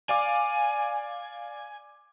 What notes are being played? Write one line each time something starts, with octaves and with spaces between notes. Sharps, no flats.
D5 F5 G#5 D6